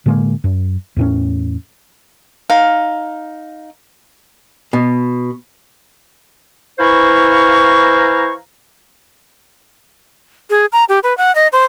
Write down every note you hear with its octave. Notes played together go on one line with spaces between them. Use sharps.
A2 D3 G#3 A#3
F#2
E2 A2 C#4
D#4 F5
B2
E3 E4 C5 F5 A#5 C#6
G#4
A#5
G4
B4
F#5
D#5
C5